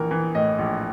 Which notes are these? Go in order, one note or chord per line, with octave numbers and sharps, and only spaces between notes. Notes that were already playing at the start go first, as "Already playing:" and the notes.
Already playing: A#1 E3 A#4
E3
A2 D#5
A#1